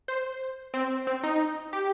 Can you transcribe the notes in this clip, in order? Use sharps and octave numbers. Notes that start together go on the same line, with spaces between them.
C5
C4
C4
D#4
G4